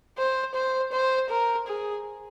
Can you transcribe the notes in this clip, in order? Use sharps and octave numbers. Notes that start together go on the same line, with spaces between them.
C5
C5
C5
A#4
G#4